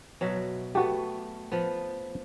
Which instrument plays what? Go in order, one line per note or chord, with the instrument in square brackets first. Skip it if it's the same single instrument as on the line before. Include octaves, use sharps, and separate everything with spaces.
[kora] B2 F#3 E5
[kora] A3 B3 [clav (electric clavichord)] F#4 G4
[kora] F3 B3